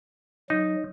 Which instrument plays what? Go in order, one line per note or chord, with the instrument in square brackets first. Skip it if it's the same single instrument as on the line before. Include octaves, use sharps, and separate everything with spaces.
[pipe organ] F#3 [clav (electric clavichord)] D#4